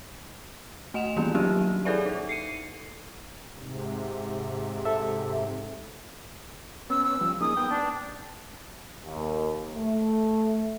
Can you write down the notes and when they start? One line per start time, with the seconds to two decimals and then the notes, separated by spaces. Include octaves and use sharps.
0.94 A3 D#5 F#5 E7 F7
1.16 D#3 E3 G3 A#3 B3 F4
1.34 F#3 A#3 C#4 D4 F#4 G4
1.85 E4 G#4 A4 B4 D5 E5
2.05 D#4 A4
2.29 C7 C#7 D#7
3.54 G#2 C3
4.85 A4 E5
6.90 B3 C#4 E6
7.04 E6
7.21 F3 G3
7.41 A#3 D#4 G#4 D#6
7.57 B3 G5
7.69 D4
9.05 D#2
9.76 A3